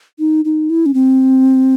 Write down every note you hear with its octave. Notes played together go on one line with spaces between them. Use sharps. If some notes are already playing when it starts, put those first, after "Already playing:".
D#4
D#4
E4
C#4
C4